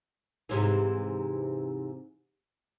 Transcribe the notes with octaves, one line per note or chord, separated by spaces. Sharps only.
G#2 C3 E3